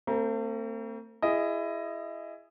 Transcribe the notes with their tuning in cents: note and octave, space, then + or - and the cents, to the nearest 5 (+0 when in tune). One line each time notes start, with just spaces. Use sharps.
A3 +45 C4 +0 A#5 +30
E4 +20 G#4 -10 D#5 +0